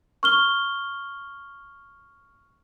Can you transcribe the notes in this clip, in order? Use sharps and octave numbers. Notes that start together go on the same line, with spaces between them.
C#6 F6 G7